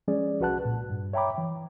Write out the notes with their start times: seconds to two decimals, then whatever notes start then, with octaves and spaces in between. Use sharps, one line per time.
0.08 F3 G#3 C#4 G#4 D5
0.40 C2 F#4 B4 F#5 A5 F#6
0.65 A#2
0.90 G2
1.13 C#5 E5 G5 A#5 B5 D6
1.38 E3